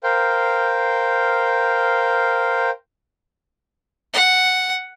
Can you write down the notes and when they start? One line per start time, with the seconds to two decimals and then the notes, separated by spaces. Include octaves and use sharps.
0.04 A#4 C5 F5 G5
4.13 F#5